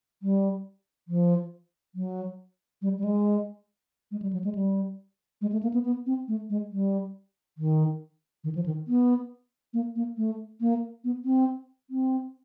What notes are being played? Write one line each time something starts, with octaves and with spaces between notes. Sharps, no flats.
G3
F3
F#3
G3
G3
G#3
G#3
G3
F#3
G#3
G3
G#3
A3
A#3
B3
B3
C4
A3
G#3
G3
D#3
D#3
F3
D#3
B3
A#3
A#3
A3
A#3
B3
C4
C4